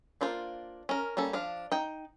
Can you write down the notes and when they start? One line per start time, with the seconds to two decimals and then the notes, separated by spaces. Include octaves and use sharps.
0.21 A#3 D4 F4 C5
0.89 C#4 A#4
1.17 G3 A#3 C#4 A4
1.33 F3 D4 F5
1.72 D#4 G5